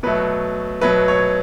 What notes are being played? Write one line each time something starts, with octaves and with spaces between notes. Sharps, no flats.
B2 F#3 A3 B4
B2 F#3 A3 B4
C#5